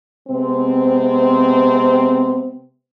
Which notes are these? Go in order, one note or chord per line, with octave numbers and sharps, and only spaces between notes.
C3 G#3 B3 C4